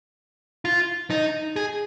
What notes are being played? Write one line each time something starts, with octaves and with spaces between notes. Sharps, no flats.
F4
D#4
G#4